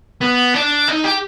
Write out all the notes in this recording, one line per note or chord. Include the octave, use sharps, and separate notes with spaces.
B3
D4
D#4
G4